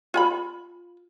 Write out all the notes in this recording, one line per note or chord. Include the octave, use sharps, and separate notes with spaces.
F4 G#5 B5